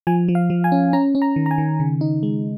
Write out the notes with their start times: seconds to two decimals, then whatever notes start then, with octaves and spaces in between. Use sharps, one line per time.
0.07 F3 G#5
0.28 F3
0.35 F5
0.50 F3
0.64 G#5
0.72 C#4
0.93 C#4 A#5
1.15 C#4
1.22 A#5
1.36 D#3
1.46 A#5
1.51 G#5
1.58 D#3
1.80 C#3
2.01 D#4
2.23 G#3